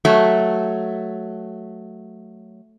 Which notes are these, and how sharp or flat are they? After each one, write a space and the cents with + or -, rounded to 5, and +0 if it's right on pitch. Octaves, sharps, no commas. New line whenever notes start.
F#3 +5 A3 +0